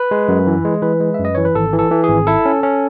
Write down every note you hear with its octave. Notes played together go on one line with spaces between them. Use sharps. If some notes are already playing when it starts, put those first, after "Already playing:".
Already playing: B4
G#3
F#2
E3
G#3
E3 B4
G#3
E5
F#2
D#5
E3 C#5
B4
G#1 A4
E3
A4
E3
G#4
G#1
E4 A4
C#4
C#4